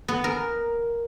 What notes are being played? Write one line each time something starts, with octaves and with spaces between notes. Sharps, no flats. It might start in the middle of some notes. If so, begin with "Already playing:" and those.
B3
A#4